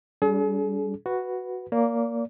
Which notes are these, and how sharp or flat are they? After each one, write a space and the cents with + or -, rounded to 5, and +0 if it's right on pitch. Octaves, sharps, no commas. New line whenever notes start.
G3 +0 D4 -45 G#4 +45
F#4 +0 B4 +0
A#3 +0 D5 -35